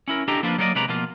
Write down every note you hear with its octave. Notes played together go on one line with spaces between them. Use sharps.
C#4 E4 A#4
D4 G4 A4 D#5 G5 A#5
F3 A#3 D4 F4 A#4 B4
F#3 A#3 A4 A#4 D5 D#5
C3 G#3 B4 D5 A#5
B2 F3 A#3 F4